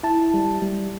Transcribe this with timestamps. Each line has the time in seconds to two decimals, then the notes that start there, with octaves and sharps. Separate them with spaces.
0.03 E4 A5
0.34 G3
0.62 G3